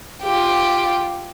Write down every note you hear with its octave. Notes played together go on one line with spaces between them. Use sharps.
F4 G4